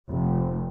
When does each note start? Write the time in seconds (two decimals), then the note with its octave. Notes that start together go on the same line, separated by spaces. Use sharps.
0.11 F1